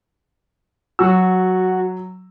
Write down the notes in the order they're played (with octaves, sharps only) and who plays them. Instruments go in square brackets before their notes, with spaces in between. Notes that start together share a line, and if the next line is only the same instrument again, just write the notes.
[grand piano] F#3 E6 [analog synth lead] F#4